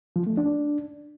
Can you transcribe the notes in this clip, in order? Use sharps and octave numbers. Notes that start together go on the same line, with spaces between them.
F3
A3
D4